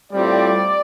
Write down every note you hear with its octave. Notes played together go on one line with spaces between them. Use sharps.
A2 G3 C4 F4 D5